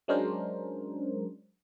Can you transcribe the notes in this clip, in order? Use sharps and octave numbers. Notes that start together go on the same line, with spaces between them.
F#3 G#3 C#4 D4 A#4 C5